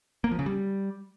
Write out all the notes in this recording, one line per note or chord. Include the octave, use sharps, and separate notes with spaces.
A#3
F3
C#3
G3